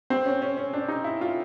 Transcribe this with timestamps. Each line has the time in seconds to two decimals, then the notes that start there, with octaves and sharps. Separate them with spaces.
0.10 C4
0.26 C#4
0.42 C#4
0.57 C#4
0.73 D4
0.88 D#4
1.04 E4
1.21 F4